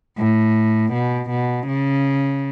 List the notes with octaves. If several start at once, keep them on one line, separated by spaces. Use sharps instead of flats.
A2
B2
B2
C#3